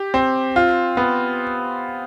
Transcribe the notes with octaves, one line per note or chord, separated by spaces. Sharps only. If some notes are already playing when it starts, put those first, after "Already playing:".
Already playing: G4
C4
F4
B3